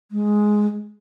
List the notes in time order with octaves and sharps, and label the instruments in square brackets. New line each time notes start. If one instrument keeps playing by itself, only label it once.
[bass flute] G#3